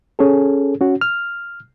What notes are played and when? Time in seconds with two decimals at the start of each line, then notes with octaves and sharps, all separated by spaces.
0.19 C#4 G#4 A4
0.81 C#4 F#4
1.01 F6